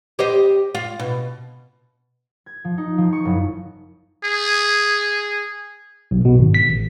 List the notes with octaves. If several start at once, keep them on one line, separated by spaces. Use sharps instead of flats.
G4 C5 D#5
F4
B2
G#6
F3
D#4
F3
C#6
F#1
G#4
B1
B2
G#1
B6
A1